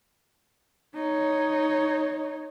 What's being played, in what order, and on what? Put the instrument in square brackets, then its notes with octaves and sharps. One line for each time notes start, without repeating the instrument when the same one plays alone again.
[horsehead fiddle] D#4 C#5